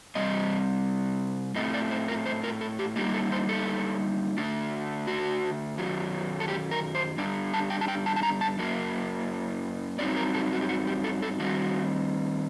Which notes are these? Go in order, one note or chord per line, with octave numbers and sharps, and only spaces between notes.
C3 G3 D#5
A2 A3 C4 D#5
D5
C5
A#4
C5
A#4
A4
G4
D3 G3 A#3 D#4 G4
A4
C5
A4
D3 A3 D4
F#4
F#2 D#3 F#3
A4
G4
A#4
C5
G2 D3 G3 D4 D5
A5
G5
A5
G5
A5
A5
A#5
A5
F#2 F#3 A#3
G2 F#3 C4 D#4 D5
A#4
A4
F#4
G4
F#4
G4
A4
A4
D#3 G3 C4 F#4